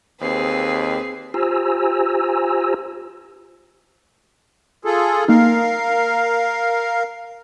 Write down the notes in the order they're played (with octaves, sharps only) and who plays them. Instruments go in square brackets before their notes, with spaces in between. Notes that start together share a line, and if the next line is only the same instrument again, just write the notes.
[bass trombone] D#2 [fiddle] C4 B4 [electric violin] G#4 C7
[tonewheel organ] F4 G4 C5 G#5 A#5 E6
[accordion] F4 G#4 A4
[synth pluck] A#3 D#4 [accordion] A#4 F5